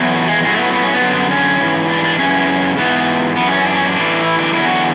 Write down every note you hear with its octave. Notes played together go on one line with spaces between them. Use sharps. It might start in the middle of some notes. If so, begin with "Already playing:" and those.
Already playing: E2 B2 F#3
A3
G#3
A2 F#3 G#3
A3
B3
B3
C#4
B3
F#2 D3 F#3
C#4
G#2 E3
D4
D4
F#2 C#3 E3 C#4
G#2 E3 B3
F#2 E3 B3
C#4
D4
C#4
D4
A2 E3
E4
D4
E2 D3 F#3 E4
F#4